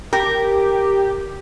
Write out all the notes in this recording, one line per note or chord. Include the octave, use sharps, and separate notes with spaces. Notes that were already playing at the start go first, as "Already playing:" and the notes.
G4 A#4